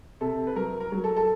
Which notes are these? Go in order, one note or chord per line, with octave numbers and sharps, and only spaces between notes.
C3 A4
B4
F#3 A#4
A#4
F#3
A4
A4